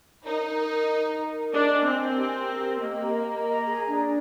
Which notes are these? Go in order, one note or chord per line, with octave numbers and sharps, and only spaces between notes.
D#4 A#4
A#4
A#4
D#5
A#5
A#4
D4 D#5
G#5
C4
A#4
G4
A#4
G4
A#3 D#5
A#5
D#5
A#5
G#4
D4